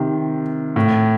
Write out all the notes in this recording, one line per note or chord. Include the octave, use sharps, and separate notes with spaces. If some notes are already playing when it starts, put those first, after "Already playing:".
Already playing: C3 D#3
A2